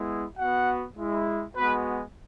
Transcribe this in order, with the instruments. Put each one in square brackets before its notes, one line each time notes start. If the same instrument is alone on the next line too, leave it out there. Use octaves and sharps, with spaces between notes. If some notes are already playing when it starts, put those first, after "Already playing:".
Already playing: [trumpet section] G#3 B3 E4
B3 F#4 F#5
G#3 E4
G#3 B3 F#4 B4